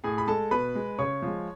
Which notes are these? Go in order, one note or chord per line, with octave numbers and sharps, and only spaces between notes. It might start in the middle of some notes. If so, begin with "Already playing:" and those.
A2 G#4 G#5
B5
G#3 A4 A5
B2 B4 B5
G#3
C#3 C#5 C#6
F3 G#3